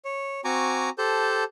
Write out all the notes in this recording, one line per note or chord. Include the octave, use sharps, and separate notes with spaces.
C#5
C4 F#4 G#5 A#5 C#6 D6
G4 A4 C5 A5 G6